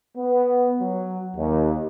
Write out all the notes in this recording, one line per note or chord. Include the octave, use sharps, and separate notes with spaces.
B3
F#3
D#2